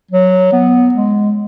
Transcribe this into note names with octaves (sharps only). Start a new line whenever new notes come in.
F#3
B3
G#3